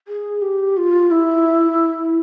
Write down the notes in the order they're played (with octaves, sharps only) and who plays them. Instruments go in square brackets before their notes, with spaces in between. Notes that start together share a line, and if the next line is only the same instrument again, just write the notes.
[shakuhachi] G#4
G4
F4
E4